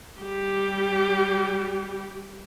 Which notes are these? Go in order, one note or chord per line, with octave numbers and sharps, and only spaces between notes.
G3 G4